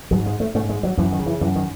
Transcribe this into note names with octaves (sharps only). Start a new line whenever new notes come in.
G#2 F#3
G#3
A3
G#2 A3
G#3
F#3
F#2 E3
D#3
C#3
E3
F#2 E3
D#3